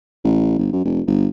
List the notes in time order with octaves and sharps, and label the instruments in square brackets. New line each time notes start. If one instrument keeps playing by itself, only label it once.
[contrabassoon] A1
G1
F#2
F1
G1